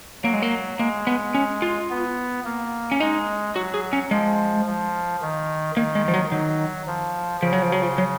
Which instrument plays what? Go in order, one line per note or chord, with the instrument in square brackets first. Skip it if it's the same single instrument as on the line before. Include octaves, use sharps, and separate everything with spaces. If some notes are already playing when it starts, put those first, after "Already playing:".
[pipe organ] F#3 [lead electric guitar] A#3
[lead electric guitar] G#3
A#3
[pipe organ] G#3 [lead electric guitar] A#3
[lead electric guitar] B3
C#4
F4
[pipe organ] B3
A#3
[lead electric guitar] C#4
[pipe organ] G#3 [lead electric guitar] D#4
[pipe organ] F#3 [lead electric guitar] F#4
[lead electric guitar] G#4
C#4
[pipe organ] F3 [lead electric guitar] G#3
[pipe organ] F3
D#3
[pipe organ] D#3 [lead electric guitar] A#3
[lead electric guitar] G#3
F3
F#3
[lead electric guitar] D#3 [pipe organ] F#3
[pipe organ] F3
[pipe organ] C#3 [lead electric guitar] F3
[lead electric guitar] F#3
F3
F#3
F3
F#3